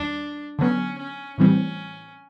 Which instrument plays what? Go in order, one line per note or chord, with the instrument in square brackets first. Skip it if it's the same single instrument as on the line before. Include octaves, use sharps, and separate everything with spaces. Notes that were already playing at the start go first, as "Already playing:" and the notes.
Already playing: [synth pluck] D#2 G3 [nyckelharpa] D4
[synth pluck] D3 F#3 B3 [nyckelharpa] C#4
[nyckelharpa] C#4
[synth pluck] A2 E3 G3 C4 [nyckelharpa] C#4